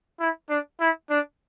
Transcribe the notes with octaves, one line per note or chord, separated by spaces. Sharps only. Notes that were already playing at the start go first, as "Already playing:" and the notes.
E4
D4
E4
D4